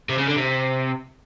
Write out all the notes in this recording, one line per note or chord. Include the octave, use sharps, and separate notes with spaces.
C3
C#3
D3
C3